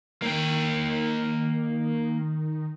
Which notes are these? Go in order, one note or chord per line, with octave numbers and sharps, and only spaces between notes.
D#3 A#3 G5